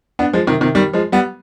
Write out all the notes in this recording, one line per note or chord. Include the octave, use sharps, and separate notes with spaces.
B3 D4
F3 G#3
C3 D#3
C3 D#3
D#3 G3
F3 G#3
G3 B3